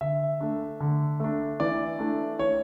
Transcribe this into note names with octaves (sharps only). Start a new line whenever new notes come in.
D3 E5
A3 D4
D3
A3 D4
E3 D5
A3 D4
E3 C#5